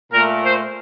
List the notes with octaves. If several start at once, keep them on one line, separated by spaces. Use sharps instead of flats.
A#2 A3 A#4
C5